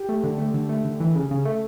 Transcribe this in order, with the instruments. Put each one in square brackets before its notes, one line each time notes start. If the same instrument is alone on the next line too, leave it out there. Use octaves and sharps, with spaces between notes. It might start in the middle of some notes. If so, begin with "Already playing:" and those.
Already playing: [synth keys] G4
A3
D3
A3
D3
A3
D3
E3
C#3
C#3
A3